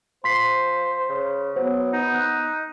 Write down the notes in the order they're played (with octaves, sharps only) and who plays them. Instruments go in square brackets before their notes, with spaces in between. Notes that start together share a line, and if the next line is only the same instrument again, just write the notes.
[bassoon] F3 [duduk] C5 [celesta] C6 B6 C7
[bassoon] C#3
[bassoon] F#3 [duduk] B3 [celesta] C5
[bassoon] D#4
[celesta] F#6